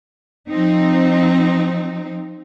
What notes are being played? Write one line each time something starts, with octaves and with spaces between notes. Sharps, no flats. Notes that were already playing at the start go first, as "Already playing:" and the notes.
F3 C4 D#4